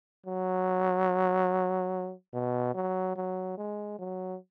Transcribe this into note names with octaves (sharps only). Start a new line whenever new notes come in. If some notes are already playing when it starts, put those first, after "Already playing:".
F#3
B2
F#3
F#3
G#3
F#3